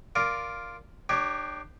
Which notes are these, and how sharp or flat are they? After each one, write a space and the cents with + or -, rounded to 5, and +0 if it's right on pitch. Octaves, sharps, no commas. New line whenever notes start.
F4 +0 A#4 +0 D5 +0
D4 +35 G4 +0 C#5 +0